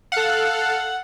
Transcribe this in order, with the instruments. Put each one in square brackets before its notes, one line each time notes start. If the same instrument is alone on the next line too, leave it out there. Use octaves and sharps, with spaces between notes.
[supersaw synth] A4 F5 [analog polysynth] F#5